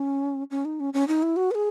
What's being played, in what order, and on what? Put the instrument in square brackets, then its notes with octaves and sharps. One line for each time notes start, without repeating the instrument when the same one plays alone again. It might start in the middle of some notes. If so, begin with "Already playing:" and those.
Already playing: [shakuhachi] C#4
C#4
D#4
C#4
C#4
D#4
E4
F#4
B4
G#4